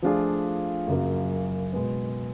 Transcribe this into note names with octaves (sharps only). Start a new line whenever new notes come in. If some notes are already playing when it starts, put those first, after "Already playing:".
F3 A3 D4 F4 G#4
F#2 C#3 F#3 A#3
B2 G#3 B3